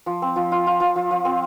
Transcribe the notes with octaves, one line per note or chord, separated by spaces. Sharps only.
F3
C4
F3
F4
F4
F3
F3
F3
C4